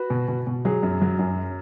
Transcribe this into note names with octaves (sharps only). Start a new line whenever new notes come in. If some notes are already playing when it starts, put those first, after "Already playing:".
Already playing: F#4 B4
B2
B2
B2
F#3 G#4
F#2
F#3
F#2